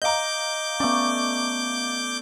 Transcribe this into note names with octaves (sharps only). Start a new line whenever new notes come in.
D#5 F5 A#5 D6 G6
A3 B3 C#4 D5